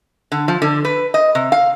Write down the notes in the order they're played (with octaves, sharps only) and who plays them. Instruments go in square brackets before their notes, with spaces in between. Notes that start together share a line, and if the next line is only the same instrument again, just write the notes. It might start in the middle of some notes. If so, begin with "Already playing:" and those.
[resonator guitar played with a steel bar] D3
F3
D3
B4
D#5
C3
F5